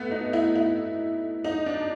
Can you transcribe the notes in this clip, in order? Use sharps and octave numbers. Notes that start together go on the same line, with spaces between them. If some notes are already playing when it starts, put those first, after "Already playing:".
Already playing: A3 B3
D#4
E4
E4
D#4
D4